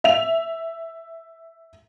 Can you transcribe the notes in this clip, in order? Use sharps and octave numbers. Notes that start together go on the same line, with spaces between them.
E5 F7